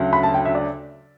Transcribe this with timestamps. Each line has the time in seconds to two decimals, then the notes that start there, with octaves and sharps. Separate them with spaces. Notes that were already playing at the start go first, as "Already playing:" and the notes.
Already playing: D2 C#3 F#3
0.13 B5
0.23 A5
0.34 G5
0.45 E5
0.55 D5